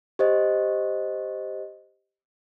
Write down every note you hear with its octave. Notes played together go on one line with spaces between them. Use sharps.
G4 C5 D#5